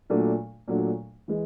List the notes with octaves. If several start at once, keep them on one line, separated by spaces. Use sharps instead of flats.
A#2 F#3 A3 D4
A#2 F#3 A3 D4
E3 G#3